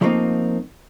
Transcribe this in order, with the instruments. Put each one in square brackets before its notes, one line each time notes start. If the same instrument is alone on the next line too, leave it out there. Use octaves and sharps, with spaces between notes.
[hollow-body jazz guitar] F3 G3 A3 A#3 C4 D#4